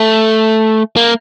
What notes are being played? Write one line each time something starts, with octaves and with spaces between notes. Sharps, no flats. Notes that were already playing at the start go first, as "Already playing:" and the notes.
Already playing: A3
A#3